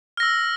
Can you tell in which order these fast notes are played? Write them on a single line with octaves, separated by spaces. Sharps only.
F6 A#6 E6